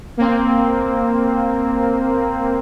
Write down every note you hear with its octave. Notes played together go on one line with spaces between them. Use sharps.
A#3 C4